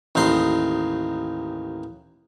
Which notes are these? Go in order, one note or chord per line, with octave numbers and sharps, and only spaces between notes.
A1 D#2 D#4 C6